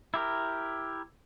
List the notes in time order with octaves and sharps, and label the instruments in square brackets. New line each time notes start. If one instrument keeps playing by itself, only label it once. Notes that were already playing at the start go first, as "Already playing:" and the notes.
[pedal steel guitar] E4 G4 A#4